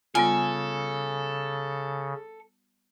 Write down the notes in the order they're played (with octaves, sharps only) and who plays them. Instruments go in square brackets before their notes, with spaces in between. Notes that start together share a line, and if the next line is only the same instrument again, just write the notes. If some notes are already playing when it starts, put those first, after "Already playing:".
[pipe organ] C#3 [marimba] G3 B3 F4 [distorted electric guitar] A4 [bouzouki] G#5